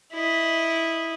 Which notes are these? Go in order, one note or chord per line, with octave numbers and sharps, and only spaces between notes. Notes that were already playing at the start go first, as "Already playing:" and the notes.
E4 D#5